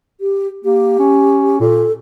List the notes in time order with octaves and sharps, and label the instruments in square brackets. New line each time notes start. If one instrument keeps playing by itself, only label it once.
[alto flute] G4
[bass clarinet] A#3 [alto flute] G4
[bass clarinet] C#4
[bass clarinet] A#2 [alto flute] A4